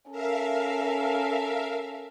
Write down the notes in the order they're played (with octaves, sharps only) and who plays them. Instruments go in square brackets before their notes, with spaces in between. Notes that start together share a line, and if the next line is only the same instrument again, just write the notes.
[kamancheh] C#4 A4 [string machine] A#4 E5 F5